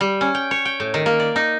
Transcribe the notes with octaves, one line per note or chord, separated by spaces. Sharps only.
G3
C#4
G5
C#5
G5
A2
D#3
A#3
D5
D#4